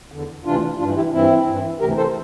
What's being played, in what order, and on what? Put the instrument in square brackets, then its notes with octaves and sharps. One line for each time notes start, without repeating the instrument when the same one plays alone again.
[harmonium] E2 D3
D2 C3 E3 D4 F4
G2 D4 F4
E3
E4 G4
G2 E3 C4 E4
G2 E3
D2 C3 E3 G4 A#4
A4 C5